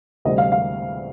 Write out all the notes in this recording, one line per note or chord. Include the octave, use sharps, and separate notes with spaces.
D2 C3 G3 D#5
F5
F5